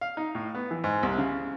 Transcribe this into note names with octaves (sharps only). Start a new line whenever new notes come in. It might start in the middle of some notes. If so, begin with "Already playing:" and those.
F5
D#4
A2
B3
E3
G#2
C2
C#3